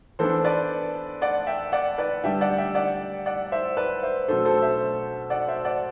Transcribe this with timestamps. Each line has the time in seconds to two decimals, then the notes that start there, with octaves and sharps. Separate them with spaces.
0.19 E3 B3 D4 A4 C5
0.44 B4 D5
1.21 D5 F#5
1.47 E5 G5
1.72 D5 F#5
1.98 B4 D5
2.24 D3 G3 D4 E5 G5
2.41 D5 F#5
2.58 E5 G5
2.75 D5 F#5
3.26 D5 F#5
3.52 C5 E5
3.77 B4 D5
4.03 C5 E5
4.28 B2 F#3 A3 D4 A4 C5
4.45 A4 C5
4.62 C5 E5
5.30 D5 F#5
5.48 C5 E5
5.65 D5 F#5